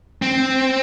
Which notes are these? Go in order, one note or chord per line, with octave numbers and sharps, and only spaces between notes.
C4